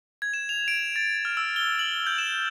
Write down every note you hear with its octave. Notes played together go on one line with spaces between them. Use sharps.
G#6
E7
F7
D7
A6
F6
E6
G7
F#7
G6
E7